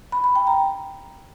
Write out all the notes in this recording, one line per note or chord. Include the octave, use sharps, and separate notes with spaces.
B5
B5
G5
A#5